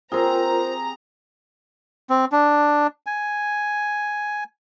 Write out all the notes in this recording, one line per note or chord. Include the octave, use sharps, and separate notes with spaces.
C4 F4 G4 G#4 A#4 C5 A#5
C4
D4
G#5